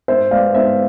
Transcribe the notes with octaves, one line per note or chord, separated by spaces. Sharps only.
G#2 C5 E5
G#3 B3 D5 F5
G#2 C5 E5